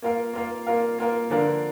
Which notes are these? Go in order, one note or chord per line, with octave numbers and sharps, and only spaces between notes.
A#3 F4 A#4 F5
A#3 F4 A#4 F5
A#3 F4 A#4 F5
A#3 F4 A#4 F5
D3 F3 D4 A#4 F5